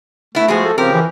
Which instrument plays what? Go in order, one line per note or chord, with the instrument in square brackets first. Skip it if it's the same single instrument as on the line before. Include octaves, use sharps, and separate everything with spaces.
[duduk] A3 [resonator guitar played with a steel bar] B3 E4
[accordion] F3 F#4 [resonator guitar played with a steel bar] G#3 B3 G#4
[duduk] A4
[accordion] C#3 F3 G4 [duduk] C4 [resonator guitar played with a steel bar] A#4
[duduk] E3